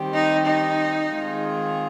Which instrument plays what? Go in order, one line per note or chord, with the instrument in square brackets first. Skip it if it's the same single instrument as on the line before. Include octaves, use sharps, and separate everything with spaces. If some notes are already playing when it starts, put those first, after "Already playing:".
Already playing: [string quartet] D#3 G3 C4 G4
[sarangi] D#4
D#4
[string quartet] D#3 G#3 C4 F4 G#4